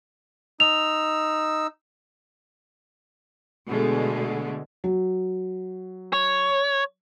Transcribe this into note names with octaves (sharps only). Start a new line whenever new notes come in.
D#4 E6 F7
B2 D3 G#3 A3
F#3
C#5